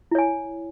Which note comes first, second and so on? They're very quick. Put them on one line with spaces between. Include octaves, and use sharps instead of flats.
E4 C#5 G#5